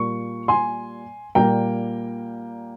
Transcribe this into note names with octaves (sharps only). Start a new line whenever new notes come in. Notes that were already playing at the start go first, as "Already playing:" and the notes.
Already playing: A#2 G3 A#3 C#6
G#5 C6
A#2 G3 A#3 G5 A#5